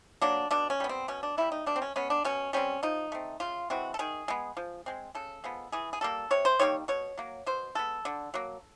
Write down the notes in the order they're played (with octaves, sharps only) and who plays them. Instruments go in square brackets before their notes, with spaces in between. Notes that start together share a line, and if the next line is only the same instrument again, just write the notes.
[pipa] F#3 A#3 D4
B2 D4
C#4
G3 B3
C4
B2 C#4
D4
G3 A#3 E4
D#4
B2 D4
C4
C#4
G#3 B3 C#4
D4
B2 C#4
G3 C4 C#4
F3 D#4
A3 C4
C#3 F4
E3 G#3 C4 F#4
A4
D#3 G#4
G#3 B3
F3
G#3 C4
C#3 A4
F3 G#3 B3
E3 G#4
G#4
G3 A#3 A4
C3 C#5
C5
D#3 G3 A#3 C#5
B2 C#5
F#3 A#3
B2 C5
G#3 B3 A4
D3
F#3 A#3